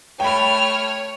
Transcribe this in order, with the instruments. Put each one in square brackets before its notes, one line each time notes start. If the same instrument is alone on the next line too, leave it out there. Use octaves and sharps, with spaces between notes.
[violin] A3 F6 [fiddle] C#5 [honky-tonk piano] G5 B5